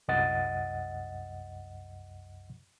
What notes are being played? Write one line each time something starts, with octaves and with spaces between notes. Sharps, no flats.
C2 F#2 D#5 F#5 A6